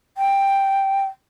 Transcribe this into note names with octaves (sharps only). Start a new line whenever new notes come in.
G5